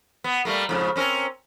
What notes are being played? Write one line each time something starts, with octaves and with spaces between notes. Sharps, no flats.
B3
G3 A3 A#3
F2 G#2 C#3
C4 C#4 A#4